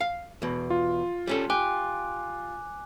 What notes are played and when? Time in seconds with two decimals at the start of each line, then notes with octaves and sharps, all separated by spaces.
0.01 F5
0.42 E2 B2
0.70 F4
1.27 G3 C#4 A4
1.50 G4 G#5 D6 F#6